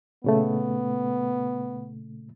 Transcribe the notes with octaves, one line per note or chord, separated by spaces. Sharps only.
A#2 C#3 A3 B3